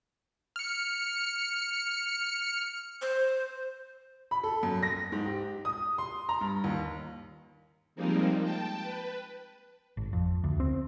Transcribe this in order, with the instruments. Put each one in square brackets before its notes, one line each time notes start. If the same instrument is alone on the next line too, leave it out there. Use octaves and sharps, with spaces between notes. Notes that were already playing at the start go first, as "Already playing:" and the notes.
[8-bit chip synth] F6 C#7
[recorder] C5
[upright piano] B5
A4
F#2
A#6
G#2
G4
D#6
C6
A#5
G2
D#2
[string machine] F3 G3 G#3 A#3 C4 D#4
G5 A5
B4
[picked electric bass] G#1
F2
D2
C4